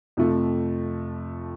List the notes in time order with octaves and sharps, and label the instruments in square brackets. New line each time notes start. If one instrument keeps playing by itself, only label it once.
[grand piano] F2 C3 F3 A3